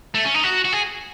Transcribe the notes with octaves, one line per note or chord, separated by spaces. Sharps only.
A3
C#4
D#4
F#4
F#4
G#4